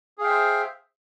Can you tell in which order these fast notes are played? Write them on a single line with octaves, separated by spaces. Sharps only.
G#4 F5 G5 E5 C5